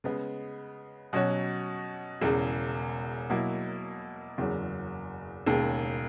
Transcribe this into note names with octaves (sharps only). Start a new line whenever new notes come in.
C#3 G#3 B3
B2 F#3 C#4 F#4 C#5
E1 E2 C#3
B2 F#3 A#3 E4
F#1 E2 C#3 F#3
E1 D#2 C#3